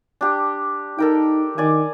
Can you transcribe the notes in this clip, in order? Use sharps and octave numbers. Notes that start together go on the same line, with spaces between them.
D4 G4
D#4 A4 A#4 G5
D#3 D5 G#5